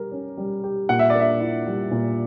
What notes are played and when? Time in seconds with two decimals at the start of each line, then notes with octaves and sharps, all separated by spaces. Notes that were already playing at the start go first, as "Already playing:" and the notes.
Already playing: G3 G4 A#4
0.12 C#4
0.37 G3
0.64 G4
0.89 A#2 F#5
0.99 E5
1.10 A#3 D5
1.20 E5
1.40 E4
1.66 G3
1.91 A#2